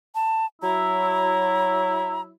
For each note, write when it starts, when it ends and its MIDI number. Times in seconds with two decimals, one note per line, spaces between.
0.15 0.46 81
0.62 2.31 54
0.62 2.31 64
0.62 2.21 82